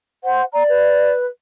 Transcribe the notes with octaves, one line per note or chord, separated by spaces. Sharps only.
C5 F#5
D5 A#5
B4